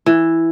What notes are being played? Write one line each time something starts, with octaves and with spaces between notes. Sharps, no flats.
E3